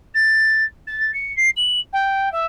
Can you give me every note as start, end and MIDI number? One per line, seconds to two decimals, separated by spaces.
0.14 0.64 93
0.87 1.13 93
1.14 1.35 97
1.36 1.49 96
1.56 1.80 102
1.93 2.31 79
2.32 2.46 76